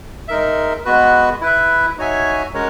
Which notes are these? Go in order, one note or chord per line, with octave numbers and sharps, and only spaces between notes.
G#3 D#4 A#4 E5
G#3 B3 F#4 B4
E4 B4 E5
D#4 F#4 C#5 E5 G#5
G#3 C#4 F#4 A#4 C#5